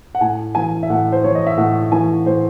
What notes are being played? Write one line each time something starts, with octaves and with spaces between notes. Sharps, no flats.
F#5
A2 G#5
E3 G#5
E5
A2 F#5
C5
E3 C#5
D#5
E5
A2 F#5
E3 G#5
A2 C5